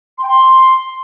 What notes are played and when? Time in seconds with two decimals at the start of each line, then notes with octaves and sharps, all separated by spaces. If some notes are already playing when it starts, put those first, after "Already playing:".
0.18 C6
0.23 G5
0.28 C6